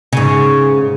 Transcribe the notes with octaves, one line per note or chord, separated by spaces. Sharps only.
G#2 C#3